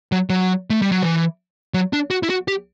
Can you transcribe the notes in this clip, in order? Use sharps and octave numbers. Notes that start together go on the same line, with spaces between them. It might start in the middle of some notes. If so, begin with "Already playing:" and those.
F#3
F#3
A3
G3
F#3
E3
F#3
D4
F#4
E4
F#4
G4